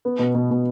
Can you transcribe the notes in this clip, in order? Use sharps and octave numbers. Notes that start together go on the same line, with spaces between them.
B3
B2
B2
B2